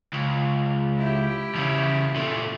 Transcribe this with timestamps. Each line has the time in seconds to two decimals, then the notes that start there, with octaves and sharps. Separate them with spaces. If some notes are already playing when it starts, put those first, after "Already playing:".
0.14 C#2
0.98 E4 G4
1.55 E2 C#3
2.16 A#2 A3